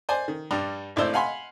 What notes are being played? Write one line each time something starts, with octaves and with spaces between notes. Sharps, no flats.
C5 D5 G#5
D#3
G2 G3
G#1 A2 D4 C5 E6
F5 F#5 G#5 B5 C6